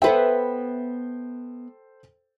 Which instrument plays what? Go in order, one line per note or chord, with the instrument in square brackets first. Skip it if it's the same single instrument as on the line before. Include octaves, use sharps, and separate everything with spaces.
[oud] B3 B4 E5 [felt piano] A4 C5 G5